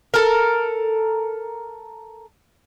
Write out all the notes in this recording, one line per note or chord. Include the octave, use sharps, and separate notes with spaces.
A4 A#4